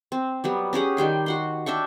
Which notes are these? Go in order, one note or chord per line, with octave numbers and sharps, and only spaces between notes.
C4
F#3 G3 B3
C#4 G4 G#4 F#5
D#3 G3 G5 C6
F#4 F#5 C6
D4 E5 G5 C#6